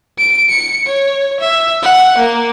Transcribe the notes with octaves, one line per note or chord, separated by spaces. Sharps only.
D7
C#7
C#5
E5
F#5
A#3